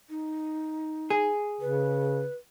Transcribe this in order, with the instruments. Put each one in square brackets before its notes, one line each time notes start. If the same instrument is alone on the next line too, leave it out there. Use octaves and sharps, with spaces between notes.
[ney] D#4
[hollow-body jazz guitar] G#4
[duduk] C#3 [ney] B4